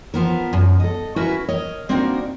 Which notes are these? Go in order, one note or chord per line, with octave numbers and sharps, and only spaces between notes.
F3 B3 A#4
F#2 B2 F3
A4 D#5
C#4 E4 F#4 A#4 B4
A#4 C#5 D#5
A#3 C4 D4 D#4 F#4 A#4